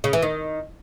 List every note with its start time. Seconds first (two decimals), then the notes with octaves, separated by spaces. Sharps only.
0.04 C#3
0.13 E3
0.22 D#3